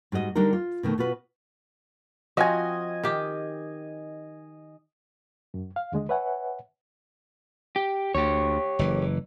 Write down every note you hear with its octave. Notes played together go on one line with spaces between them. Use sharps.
G#2 G3 F#4 D#5
D3 G3 D4 D#4 G4 A#4
F4
B2 D#3 A3
B2 F4 F#4 B4
F3 C4 F#4 D#5 G#5
D#3 G4
F#2
F5
D#2 D3 G#3 D#5
B4 C#5 E5 F#5 G#5
G4
D2 G4 C#5
F#1 E3